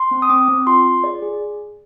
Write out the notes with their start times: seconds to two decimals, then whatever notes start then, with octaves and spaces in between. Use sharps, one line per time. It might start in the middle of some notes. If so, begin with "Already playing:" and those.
Already playing: C6
0.11 C4
0.22 D#6
0.30 C4 D6
0.48 C4
0.67 F4 C6
0.85 F4
1.04 G#4 D5
1.22 G#4